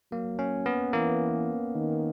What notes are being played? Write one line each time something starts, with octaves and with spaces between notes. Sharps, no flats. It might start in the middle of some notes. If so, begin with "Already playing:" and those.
F#3 A#3
C#4
B3
E3 A#3
D#3